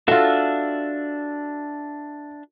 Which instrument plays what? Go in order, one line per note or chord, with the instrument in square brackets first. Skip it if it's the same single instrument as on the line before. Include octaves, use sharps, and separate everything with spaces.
[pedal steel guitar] D4 E5 [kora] F4 F#4 [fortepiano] A4